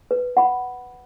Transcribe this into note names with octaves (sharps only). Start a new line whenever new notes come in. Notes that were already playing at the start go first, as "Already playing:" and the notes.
B4
F#5 B5